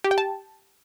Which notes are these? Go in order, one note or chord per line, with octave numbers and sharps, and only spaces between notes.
G4
G5
A5